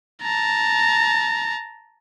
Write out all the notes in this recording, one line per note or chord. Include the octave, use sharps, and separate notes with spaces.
A5 A#5